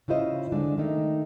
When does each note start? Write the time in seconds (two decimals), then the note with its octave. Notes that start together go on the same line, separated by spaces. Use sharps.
0.08 C#3 E4 F4 C5 D#5
0.52 D3 G#3 D4
0.78 D#3 A3 D#4